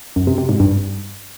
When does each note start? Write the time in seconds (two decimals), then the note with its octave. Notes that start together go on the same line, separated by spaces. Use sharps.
0.16 F#2
0.27 C3
0.38 C3
0.49 G#2
0.60 G2